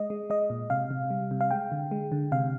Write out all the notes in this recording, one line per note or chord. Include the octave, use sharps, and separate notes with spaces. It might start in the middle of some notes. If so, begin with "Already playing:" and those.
Already playing: G#3 D#5
G#3
G#3 D#5
A#2
C3 F5
C3
G3
C3
F5
G#3 G5
D3
G#3
D3
C3 F5